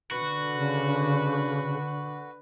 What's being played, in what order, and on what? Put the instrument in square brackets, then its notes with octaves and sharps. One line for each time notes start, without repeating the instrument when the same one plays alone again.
[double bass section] D3 [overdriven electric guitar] F#4 [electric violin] B4
[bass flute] C#3